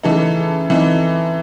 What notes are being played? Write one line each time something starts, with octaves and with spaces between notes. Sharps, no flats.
C#3 E3 A3 D#4 A4
E3 C4 D#4